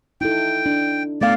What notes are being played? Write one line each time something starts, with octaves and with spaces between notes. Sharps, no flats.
D#4 E4 A4 G5
D4
A3 B3 D5 F5